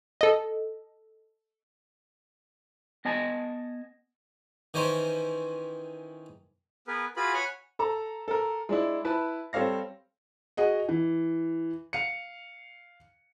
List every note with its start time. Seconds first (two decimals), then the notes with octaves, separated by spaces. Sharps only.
0.21 A4 D#5
3.05 B3 D#5 G#5 A5
4.74 D#3 E3 C#4 C5
6.87 B3 G#4 A#4 B4
7.16 F4 F#4 G#4 B4 B5
7.34 C#5 F#5 G#5 B5
7.79 A4 A5 A#5
8.28 A4 A#4
8.69 G#3 D4 E4
9.05 E4 B4 A5
9.53 G3 C4 A4 C#5 F5 A#6
10.57 F#4 G#4 D#5 F#5
10.89 E3
11.93 F5 C#7